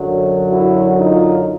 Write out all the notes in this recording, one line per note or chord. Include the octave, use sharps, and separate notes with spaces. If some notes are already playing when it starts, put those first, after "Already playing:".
Already playing: F#2 D3 F#3
E4 F#4
D#4 F4